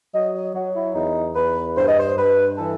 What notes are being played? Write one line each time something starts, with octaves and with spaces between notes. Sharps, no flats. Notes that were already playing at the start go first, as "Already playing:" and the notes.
F#3 D#5
D#5
F#3 F#4
E4
E2 D#4
E2 B4
G2 C5
D#5
C5
G2 B4
E3 A4